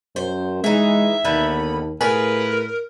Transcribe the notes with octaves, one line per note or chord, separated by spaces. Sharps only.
F#2 C5
E3 G#3 D#4 E5
D#2 D3 D#3 B3 B5
A2 F4 G#4 A#4 B4